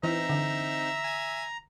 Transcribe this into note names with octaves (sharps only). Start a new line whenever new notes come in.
E3 C4 D#4 E5 A#5
D3
G#5 G#6